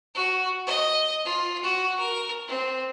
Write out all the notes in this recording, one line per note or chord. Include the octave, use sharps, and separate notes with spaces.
F#4
D#5
F4
F#4
A#4
C4